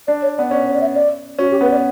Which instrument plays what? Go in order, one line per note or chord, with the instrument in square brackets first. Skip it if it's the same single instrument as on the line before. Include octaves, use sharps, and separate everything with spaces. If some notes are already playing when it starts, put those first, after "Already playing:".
[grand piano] D4 [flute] D5
[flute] C#5
[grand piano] B3 [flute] D5
[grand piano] C#4 [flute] D5
[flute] C#5
D5
E5
D5
[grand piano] C#4 [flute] F#4
[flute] G4
[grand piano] B3 [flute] B4
[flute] D5